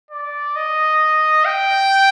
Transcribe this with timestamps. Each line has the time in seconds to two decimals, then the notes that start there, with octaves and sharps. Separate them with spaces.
0.11 D5
0.56 D#5
1.45 G5